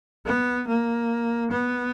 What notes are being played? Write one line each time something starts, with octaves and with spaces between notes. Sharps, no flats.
B3
A#3
B3